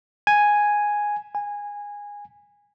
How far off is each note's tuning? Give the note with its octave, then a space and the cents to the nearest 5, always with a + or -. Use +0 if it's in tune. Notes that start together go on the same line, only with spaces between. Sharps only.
G#5 +0
G#5 -15